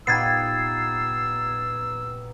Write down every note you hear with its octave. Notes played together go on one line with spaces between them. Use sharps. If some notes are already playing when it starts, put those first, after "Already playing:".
A#2 B3 D#4 G4 E6 G#6 A6 C7